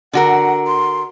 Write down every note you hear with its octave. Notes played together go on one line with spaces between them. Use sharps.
D3 F#4 A#4 F#5
C6